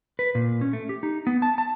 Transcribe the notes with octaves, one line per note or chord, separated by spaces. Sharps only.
B4
A#2
C#4
A3
G4
D#4
B3
A5
A5